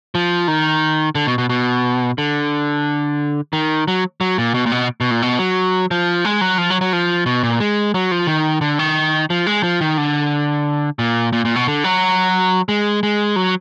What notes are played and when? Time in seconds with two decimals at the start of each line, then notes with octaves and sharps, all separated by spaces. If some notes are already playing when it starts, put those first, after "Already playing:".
0.15 F3
0.48 D#3
1.15 D3
1.27 B2
1.38 B2
1.49 B2
2.18 D3
3.53 D#3
3.88 F#3
4.21 F#3
4.38 A#2
4.54 B2
4.66 A#2
4.72 B2
5.01 B2
5.11 A#2
5.22 B2
5.39 F#3
5.91 F3
6.25 G#3
6.41 F#3
6.58 F3
6.70 F#3
6.81 F#3
6.93 F3
7.26 B2
7.43 A#2
7.60 G#3
7.94 F#3
8.11 F3
8.27 D#3
8.61 D3
8.79 D#3
9.30 F3
9.47 G#3
9.63 F3
9.81 D#3
9.98 D3
10.99 A#2
11.33 A#2
11.45 A#2
11.56 B2
11.67 D3
11.84 F#3
12.69 G#3
13.03 G#3
13.36 F#3